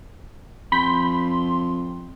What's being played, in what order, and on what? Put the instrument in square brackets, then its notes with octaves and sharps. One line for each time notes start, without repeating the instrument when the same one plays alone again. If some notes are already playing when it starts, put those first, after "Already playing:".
[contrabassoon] F2 [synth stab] B5 G6 B6 [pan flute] C6